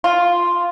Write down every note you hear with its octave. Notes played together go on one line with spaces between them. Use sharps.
F4